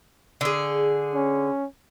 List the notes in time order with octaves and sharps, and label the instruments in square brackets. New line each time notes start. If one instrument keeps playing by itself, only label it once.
[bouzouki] D3 G#4
[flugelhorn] C#4